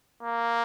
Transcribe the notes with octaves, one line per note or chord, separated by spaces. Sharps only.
A#3